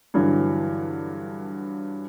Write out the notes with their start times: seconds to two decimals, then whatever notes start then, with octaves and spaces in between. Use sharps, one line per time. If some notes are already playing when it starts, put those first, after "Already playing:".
0.14 G2 D3 E3 F#3